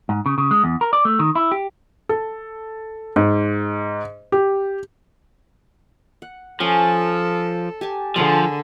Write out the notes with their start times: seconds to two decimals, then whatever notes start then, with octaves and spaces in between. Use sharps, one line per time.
0.09 G#2
0.26 C#3
0.38 C#3
0.51 G#3
0.64 E2
0.81 A#4
0.93 D5
1.05 A3
1.19 D#3
1.35 E4
1.52 G4
2.09 A4
3.16 G#2
4.32 G4
6.22 F#5
6.60 F3 C#4 A4
7.81 G4 G#5 A5
8.16 D3 F3 G#4 A#4